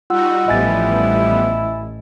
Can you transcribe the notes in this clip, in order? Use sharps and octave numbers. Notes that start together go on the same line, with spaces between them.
G3 D#4 F4 F#4 F#5 E6
A1 F3 G3 B3 E4 D#5 G#5 A6